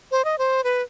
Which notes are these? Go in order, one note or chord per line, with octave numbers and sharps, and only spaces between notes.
C5
D#5
C5
B4